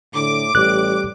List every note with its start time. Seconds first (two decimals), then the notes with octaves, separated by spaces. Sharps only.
0.15 A2 D3 D6
0.55 A1 G3 F#6